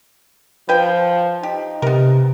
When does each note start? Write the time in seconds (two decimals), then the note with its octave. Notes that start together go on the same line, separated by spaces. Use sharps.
0.69 F3 B4 G5
1.43 D#4 G4
1.82 C3 B3 A#4